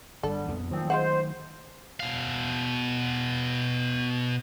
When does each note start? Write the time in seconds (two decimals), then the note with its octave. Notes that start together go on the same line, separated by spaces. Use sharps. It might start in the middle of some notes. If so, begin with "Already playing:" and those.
0.23 G1 D3 G3 A4
0.48 A#1 F2 B3
0.71 A#2 D#3 F3 F#3 A3 C4
0.90 G#3 F4 C5 F#5
2.00 B2 F5